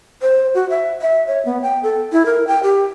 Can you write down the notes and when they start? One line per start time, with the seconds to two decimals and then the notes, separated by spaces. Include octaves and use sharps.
0.22 C5
0.55 F#4
0.70 E5
1.01 E5
1.27 C#5
1.45 B3
1.62 G5
1.83 A4
2.12 E4
2.26 A#4
2.47 G5
2.63 G4